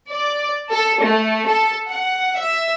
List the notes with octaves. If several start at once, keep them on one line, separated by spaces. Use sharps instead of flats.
D5
A4
A3
A4
F#5
E5